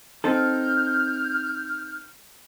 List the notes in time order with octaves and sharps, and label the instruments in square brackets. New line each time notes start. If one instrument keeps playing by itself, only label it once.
[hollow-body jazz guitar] C4 D#4 A4 [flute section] F6 G6